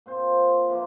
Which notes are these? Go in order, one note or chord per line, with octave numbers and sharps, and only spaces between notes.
A#2 C4 C5
E3 F3 A#3